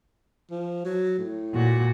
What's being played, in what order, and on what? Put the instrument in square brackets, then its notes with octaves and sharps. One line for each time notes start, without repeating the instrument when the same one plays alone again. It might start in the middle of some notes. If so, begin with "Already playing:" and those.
[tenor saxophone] F3
F#3
A2
[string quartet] A#2 F#4